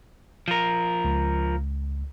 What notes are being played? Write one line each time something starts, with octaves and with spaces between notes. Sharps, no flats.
F3 A#4
C#2